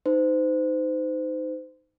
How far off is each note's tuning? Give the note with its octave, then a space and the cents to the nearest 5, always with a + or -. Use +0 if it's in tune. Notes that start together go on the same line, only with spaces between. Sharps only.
D#4 +0 C5 -30